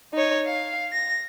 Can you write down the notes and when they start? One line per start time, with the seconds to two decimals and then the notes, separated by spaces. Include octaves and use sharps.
0.13 D#4 C#5
0.46 F5
0.92 A#6